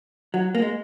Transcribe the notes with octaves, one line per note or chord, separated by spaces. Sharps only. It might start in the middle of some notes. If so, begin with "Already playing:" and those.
F#3
A#3
G#3